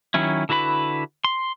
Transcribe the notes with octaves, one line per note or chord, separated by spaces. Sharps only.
D#3 F#3 C#4 E4
D3 E4 F#4 B4 B5
C6